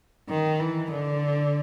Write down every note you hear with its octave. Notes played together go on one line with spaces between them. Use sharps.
D#3
E3
D3